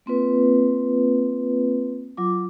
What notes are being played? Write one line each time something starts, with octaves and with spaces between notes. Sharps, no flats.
A#3 C4 F4 B4
F#3 F4 D6